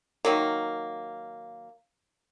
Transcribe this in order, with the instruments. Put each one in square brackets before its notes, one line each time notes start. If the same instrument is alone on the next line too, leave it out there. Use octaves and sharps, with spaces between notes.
[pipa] D#3 F#3 A#3